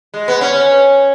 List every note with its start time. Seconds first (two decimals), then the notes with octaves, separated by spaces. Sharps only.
0.14 G#3
0.28 B3
0.41 C#4